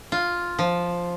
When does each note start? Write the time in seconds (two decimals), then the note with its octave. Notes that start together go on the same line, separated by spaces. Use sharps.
0.12 F4
0.59 F3